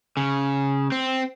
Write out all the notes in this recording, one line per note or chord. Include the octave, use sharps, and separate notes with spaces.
C#3
C4